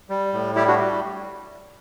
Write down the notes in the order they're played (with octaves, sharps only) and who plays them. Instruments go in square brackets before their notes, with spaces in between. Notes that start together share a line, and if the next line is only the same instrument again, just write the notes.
[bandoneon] G3
A2
G3 E4 G4
D4 F#4